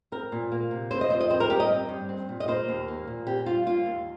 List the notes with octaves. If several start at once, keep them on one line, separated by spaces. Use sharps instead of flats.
C4 A#4
A#2
A#3
C3
C4 C5
D#5
F2 C5
D#5
C4 C5
A#4
G2 G4
D#5
C4
G2
C4
A#2
D#5
A#3 C5
D#2
A#3
A#2
C4 G4
G2 F4
A#3 F4
D#2